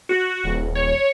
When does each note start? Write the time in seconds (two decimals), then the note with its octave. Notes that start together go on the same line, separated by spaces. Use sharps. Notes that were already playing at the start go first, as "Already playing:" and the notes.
0.09 F#4
0.44 D#1
0.75 C#5